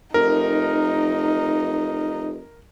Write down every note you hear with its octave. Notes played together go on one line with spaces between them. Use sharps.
F1 D#4 A#4